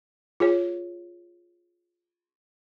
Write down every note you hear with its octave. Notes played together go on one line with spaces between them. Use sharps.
F4 G#4 C#5